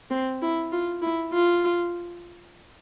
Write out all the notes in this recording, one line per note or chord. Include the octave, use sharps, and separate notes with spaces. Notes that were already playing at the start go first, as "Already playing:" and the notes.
C4
E4
F4
E4
F4